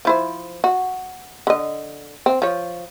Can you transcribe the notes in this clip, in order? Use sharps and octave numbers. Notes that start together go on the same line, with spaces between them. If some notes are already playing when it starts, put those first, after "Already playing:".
F3 E4 C5
F#4
D3 D#5
C4
F3 C#5